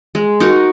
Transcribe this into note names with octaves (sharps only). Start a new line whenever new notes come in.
G#3
D#4 F#4 A#4